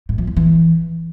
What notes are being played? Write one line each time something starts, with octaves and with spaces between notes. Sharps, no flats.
A2
F3
E2
E3